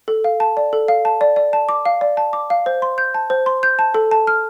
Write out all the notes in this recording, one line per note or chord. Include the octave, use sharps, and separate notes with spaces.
A4
F5
A5
D5
A4
F5
A5
D5
D5
A5
D6
F5
D5
A5
D6
F5
C5
C6
G6
A5
C5
C6
G6
A5
A4
A5
F6